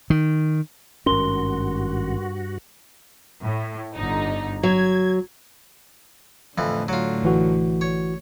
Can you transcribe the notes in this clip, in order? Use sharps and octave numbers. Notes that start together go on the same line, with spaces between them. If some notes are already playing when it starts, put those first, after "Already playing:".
D#3
G#1 G2 C#4 F#4 A#4 C6 G7
A2
G1 D3 D#4
F#3 G#6
F2 A2 D3 E3
F#3 F4
A1 E3 F#4
C#5